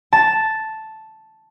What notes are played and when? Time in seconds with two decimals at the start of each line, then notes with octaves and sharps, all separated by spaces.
0.13 A5